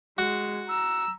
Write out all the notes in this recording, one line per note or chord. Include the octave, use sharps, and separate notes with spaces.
G#3 F#4
A#5 E6